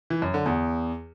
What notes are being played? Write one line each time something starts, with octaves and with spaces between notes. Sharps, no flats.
E3
F#2
D3
E2